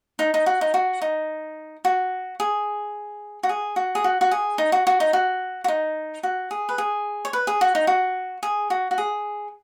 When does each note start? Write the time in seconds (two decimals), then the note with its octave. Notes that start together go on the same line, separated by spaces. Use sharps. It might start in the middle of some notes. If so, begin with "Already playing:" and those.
0.19 D#4
0.34 D#4
0.46 F#4
0.61 D#4
0.74 F#4
1.02 D#4
1.85 F#4
2.40 G#4
3.43 F#4
3.49 G#4
3.76 F#4
3.95 G#4
4.04 F#4
4.21 F#4
4.31 G#4
4.58 D#4
4.72 F#4
4.87 F#4
5.00 D#4
5.13 F#4
5.64 F#4
5.68 D#4
6.23 F#4
6.51 G#4
6.69 B4
6.78 G#4
7.25 C#5
7.33 B4
7.47 G#4
7.61 F#4
7.75 D#4
7.87 F#4
8.43 G#4
8.70 F#4
8.91 F#4
8.98 G#4